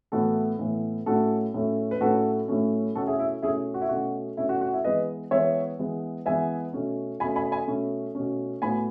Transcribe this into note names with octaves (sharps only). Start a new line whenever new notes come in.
A2 E3 B3 F#4 A4
A2 E3 B3
A2 F#3 A3 C#4 F#4 A4
A2 F#3 A3 C#4
B4
A2 F#3 A3 C#4 F#4 A4
A2 F#3 A3 C#4
B2 A3 C#4 F#4 A4
E4 G#4
E4
B2 A3 C#4 E4 G#4
F#4
E4
B2 A3 C#4 F#4
B2 A3 C#4 E4
F#4
F#4
E4
E3 G#3 B3 B4 D#5
E3 G#3 B3 C#5 E5
E3 G#3 B3
E3 G#3 B3 E5 G#5
B2 A3 C#4
B2 A3 C#4 G#5 B5
G#5 B5
G#5 B5
B2 A3 C#4
B2 A3 C#4
A2 F#3 B3 G#5 B5